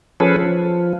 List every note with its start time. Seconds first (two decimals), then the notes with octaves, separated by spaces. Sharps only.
0.20 F3 C#4 G#4 A4 B4
0.36 F3